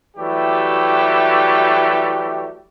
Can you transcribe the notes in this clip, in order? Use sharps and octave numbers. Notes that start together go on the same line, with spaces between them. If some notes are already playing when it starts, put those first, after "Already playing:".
E3 F#3 G3 A3 G4